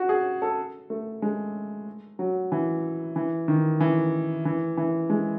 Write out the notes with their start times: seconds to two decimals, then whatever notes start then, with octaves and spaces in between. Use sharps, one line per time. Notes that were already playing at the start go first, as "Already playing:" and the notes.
Already playing: F#4
0.09 G#4
0.42 A4
0.90 A3
1.22 G#3
2.19 F#3
2.52 E3
3.16 E3
3.48 D#3
3.80 E3
4.45 E3
4.77 E3
5.10 G#3